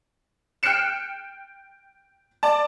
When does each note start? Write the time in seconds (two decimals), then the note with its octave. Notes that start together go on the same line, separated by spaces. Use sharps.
0.63 G5 F6 F#6 C7 C#7 E7
2.43 D5 A5